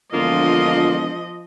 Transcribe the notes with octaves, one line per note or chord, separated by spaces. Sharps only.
E1 D3 F3 A#3 F4 D#5